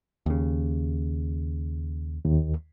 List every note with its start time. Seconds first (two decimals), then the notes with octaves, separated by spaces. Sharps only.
0.26 D#2 C#3
2.25 D#2